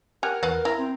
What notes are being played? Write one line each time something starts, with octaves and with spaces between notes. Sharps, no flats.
G4 A#4 F#5 G#5 F6
E2 B4 F5 F#5
E4 A#5
C4